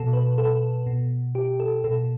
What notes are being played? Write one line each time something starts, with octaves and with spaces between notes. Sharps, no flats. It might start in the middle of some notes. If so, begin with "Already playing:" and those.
Already playing: B2 A4
B4
A4
B2
G4
A4
B2 A4